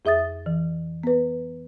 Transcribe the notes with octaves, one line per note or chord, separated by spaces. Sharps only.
F2 G#4 E5 D#6 A6
E3
B3 B4